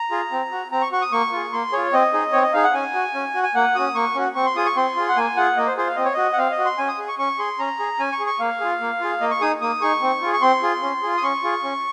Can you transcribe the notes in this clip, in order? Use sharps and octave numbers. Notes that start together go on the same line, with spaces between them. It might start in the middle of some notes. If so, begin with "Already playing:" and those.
Already playing: A#5
F4 G#4
C4
F#4
C4 A#5
C#6
F#4 C#6
D#6
A#3 C#6
F4 G#4
A#3 C6
F4 G#4 C#5
C4 D#5
D#4 G#4
C4 C#5
D#5
D#4 G#4 F5
F#5
C#4 G#5
F#4
C#4
F#4
G#5
A#3 F#5
C#4 F#4 D#6
A#3 C#6
C#4 F#4
C4 C#6
C6
F4 G#4 D#6
C#6
C4 C6
F4 G#4
F#5
A#3 G#5
F4 G#4 F#5
A#3 D#5
C5
F4 G#4 C5
F5
C4 D#5
C#5
F#4 D#5
F#5
C4 F5
D#5
F#4
C6
C#4 G#5
D#6
G#4
C#6
C#4 C#6
G#4 C6
C#4 A#5
G#4
C#4 G#5
C#6
G#4
C#6
A#3 F5
F4 G#4
A#3
F4 G#4
A#3 D#5
C#6
D#4 G#4 D#6
A#3 D#6
D#4 G#4 C#6
C4
F4 G#4
C#6
C4 C6
F4 G#4
C#4
F4 G#4
D#6
C#4 C#6
F4 G#4
C#4